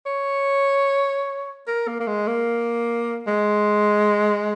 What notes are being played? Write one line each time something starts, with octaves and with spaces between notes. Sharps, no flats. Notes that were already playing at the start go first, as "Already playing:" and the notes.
C#5
A#4
A#3
A#3
G#3
A#3
G#3